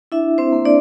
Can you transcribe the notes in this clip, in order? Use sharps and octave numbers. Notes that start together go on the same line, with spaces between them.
D4 E4 E5
C4 C5
A#3
D4 D5